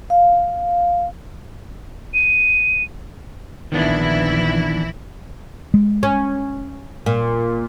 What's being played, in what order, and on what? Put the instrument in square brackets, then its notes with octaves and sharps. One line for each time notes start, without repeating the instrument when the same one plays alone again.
[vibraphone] F5
[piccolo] D#7
[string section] A#1 E3 E4 [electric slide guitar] D#3 B3 D4
[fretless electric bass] G#3
[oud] C#4
A#2